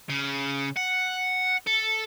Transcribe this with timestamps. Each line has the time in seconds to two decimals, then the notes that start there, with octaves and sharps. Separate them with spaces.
0.09 C#3
0.76 F#5
1.67 A4